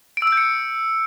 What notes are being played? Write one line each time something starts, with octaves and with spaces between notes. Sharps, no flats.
D7
E6
D7
G6
C#7